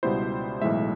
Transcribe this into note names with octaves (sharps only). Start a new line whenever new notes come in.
C#2 B2 G3 B3 E4 C5
B1 A2 E3 G#3 E5